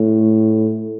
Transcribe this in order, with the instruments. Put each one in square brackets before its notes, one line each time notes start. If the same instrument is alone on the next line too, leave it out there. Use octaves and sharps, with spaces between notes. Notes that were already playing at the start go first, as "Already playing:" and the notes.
Already playing: [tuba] A2